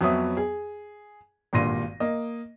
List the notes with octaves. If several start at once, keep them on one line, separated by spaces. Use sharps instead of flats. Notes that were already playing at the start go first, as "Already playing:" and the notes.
F2 F#3 B3 C#5 E5 D#6
G#4
G#1 G2 A#2 C6 A#6 D#7
A#3 D#5